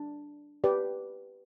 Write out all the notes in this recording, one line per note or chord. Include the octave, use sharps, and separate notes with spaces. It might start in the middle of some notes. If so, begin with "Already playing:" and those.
Already playing: D4
G4 B4 D5